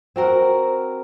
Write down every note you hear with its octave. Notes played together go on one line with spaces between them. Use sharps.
C4 F#4 A#4